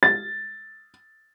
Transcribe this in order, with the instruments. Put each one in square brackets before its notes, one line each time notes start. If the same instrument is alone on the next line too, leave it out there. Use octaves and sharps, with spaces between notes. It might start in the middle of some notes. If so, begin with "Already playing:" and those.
[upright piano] A6